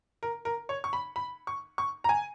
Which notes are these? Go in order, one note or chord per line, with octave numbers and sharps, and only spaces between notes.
A#4
A#4
C#5
C#6
B5
B5
C#6
C#6
A#5
G#5